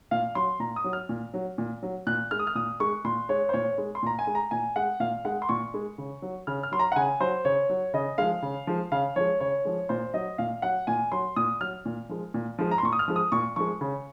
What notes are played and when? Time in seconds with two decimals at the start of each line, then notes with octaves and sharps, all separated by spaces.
0.11 A#2 F5
0.35 F#3 C6
0.60 A#2 A#5
0.76 D#6
0.84 F#3
0.93 F6
1.09 A#2
1.34 F#3
1.58 A#2
1.83 F#3
2.07 A#2 F#6
2.31 G#3 F6
2.39 D#6
2.47 F6
2.55 A#2 D#6
2.80 G#3 C#6
3.04 A#2 C6
3.29 G#3 C#5
3.49 C5
3.53 A#2 C#5
3.78 G#3
3.95 C6
4.03 A#2 A#5
4.19 G#5
4.27 G#3
4.35 A#5
4.51 A#2 G#5
4.76 G#3 F#5
5.00 A#2 F5
5.25 G#3 F#5
5.42 C6
5.49 A#2 C#6
5.74 G#3
5.98 C#3
6.22 F#3
6.47 C#3 F6
6.63 F6
6.72 F#3 C6
6.79 A#5
6.92 F#5
6.96 C#3 G#5
7.20 F#3 C5
7.45 C#3 C#5
7.70 F#3
7.94 C#3 D#5
8.18 F3 G#3 F5
8.42 C#3
8.67 F3 G#3
8.92 C#3 F5
9.16 F3 G#3 C#5
9.40 C#3 C#5
9.65 F3 G#3
9.89 A#2 C5
10.14 F#3 D#5
10.38 A#2 F5
10.62 F#3 F#5
10.87 A#2 G#5
11.12 F#3 C6
11.36 A#2 D#6
11.61 F#3 F6
11.85 A#2
12.09 F3 G#3
12.34 A#2
12.58 F3 G#3
12.71 A#5
12.78 C6
12.83 A#2 C#6
12.92 D#6
12.99 F6
13.08 F3 G#3
13.16 D#6
13.32 A#2 C#6
13.56 F3 G#3 C#6
13.81 C#3